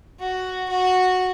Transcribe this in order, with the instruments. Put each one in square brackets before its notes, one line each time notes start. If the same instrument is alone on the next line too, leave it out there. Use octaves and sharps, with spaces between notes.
[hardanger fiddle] F#4
F#4